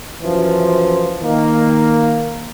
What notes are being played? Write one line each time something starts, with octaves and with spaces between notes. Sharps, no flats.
F#2 E3 F3
D#3 A#3